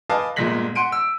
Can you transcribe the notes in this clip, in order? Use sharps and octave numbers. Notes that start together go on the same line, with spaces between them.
B4 D#5 F5 G#5 A5 D6
G1 A#2 G#3 A#6 B6 F#7
F#5 C6 D7 D#7
E6